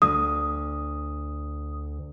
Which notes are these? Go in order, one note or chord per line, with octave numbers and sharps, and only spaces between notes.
D2 D#6